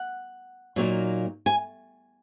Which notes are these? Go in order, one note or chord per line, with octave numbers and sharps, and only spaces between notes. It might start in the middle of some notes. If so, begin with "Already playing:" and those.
Already playing: F#5
A#2 F#3 A#3 D#4
G#5